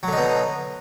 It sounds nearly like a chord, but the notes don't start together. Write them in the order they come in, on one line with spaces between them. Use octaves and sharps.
F#3 D3 D#4 B2